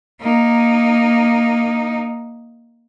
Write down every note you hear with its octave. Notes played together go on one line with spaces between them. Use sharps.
A#3 D#4